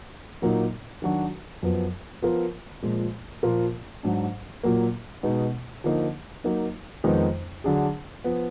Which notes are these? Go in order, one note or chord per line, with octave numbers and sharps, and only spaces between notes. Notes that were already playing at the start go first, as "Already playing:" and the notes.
A#2 F#3 A#3 D#4
D#3 F#3 D4 F#4
F#2 F3 B3
F3 B3 F4 A#4
A#2 F3 G#3
A#2 F3 A#3 F4 A#4
G#2 F#3 D4
A#2 F#3 A#3
B2 G#3 B3 D#4
D3 F3 A#3 D#4
F#3 A#3 D#4
F2 D#3 G#3 B3 D#4
D3 F#3 D4 G#4
F3 B3